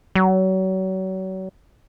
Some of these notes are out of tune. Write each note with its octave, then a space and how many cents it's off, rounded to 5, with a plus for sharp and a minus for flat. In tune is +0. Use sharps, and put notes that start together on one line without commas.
F#3 +35